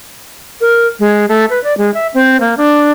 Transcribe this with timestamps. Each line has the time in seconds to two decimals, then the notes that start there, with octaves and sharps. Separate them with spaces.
0.61 A#4
1.00 G#3
1.29 A3
1.50 B4
1.64 D5
1.78 G#3
1.94 E5
2.14 C4
2.40 A#3
2.57 D4